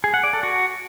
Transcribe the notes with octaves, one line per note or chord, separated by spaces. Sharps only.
G#4
F#5
D5
A4
F#4